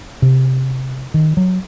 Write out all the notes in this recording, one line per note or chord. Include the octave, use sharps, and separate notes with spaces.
C3
D#3
F#3